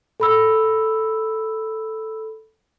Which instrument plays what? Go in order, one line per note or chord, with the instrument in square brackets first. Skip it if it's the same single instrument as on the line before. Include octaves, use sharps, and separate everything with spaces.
[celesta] A4 B5 E6